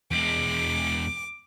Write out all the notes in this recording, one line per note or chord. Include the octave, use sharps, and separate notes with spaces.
E2 G#3 D6